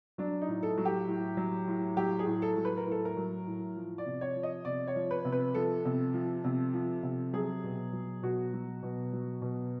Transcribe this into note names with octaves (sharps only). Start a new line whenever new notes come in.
F#3 D4
D#4
A2
A4
F#3
G4
A2
F#3
A2
F#3 G4
G#4
A2
A4
F#3
B4
A#4
A2 A4
A#4
F#3
A2
F3
D5
C3
C#5
F3
D#5
C3 D5
C#5
F3
B4
C3
B4
F3 A4
C3
F3
C3
F3
C3
F#3 G#4
B2
F#3
B2 F#4
F#3
B2
F#3
B2